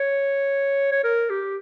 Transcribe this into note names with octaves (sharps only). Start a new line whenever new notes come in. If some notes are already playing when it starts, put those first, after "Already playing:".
Already playing: C#5
C#5
A#4
G4